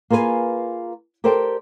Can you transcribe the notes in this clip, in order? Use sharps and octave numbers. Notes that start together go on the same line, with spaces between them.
A#3 F4 G#4 B4 G#5
G4 A4 A#4 C5 D5 G5